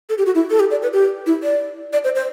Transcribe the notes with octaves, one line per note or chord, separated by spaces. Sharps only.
A4
G4
F#4
E4
A4
G4
D5
B4
G4
E4
D5
D5
C5
C5